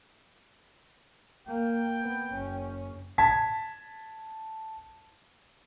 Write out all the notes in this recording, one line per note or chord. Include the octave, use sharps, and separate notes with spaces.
A#3 G5
B3
F#1 C#4
A5 G#6 B6